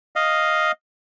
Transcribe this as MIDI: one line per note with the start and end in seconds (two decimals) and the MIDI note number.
0.16 0.72 75
0.16 0.72 77